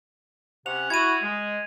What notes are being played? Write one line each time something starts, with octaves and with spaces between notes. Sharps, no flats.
C3 C#4 F#5 F7
E4 F#4 G#6 D#7
G#3